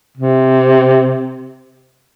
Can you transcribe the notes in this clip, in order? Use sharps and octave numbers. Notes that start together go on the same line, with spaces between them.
C3